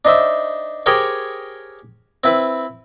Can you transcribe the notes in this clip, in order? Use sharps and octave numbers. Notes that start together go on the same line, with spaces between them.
D4 D#4 C5 E5
G4 G#4 A#4 C5 C#5 G5
C4 E4 B4